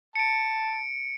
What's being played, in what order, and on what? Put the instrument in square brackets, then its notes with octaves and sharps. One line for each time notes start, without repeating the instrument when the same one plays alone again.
[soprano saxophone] A5 [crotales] C#7 D7